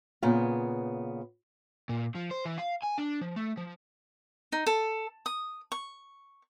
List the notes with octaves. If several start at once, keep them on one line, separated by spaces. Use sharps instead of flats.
A#2 C#3 B3
A#2
F3
C5
E3
F5
G#5
D4
F3
A3
F3
D#4
A4
D#6
C#6